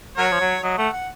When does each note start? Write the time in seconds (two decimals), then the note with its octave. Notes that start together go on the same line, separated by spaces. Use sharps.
0.18 F#3 F#4 A#4 C#5
0.32 F3
0.41 F#3
0.63 F#3 D#5
0.78 A3 F#5
0.93 F#5